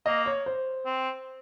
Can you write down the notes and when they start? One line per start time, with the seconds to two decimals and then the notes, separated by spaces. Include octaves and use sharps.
0.06 A#3 D#5
0.26 C#5
0.46 C5
0.86 C4